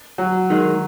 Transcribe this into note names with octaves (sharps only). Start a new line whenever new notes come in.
F#3
D#3 G#3 D#4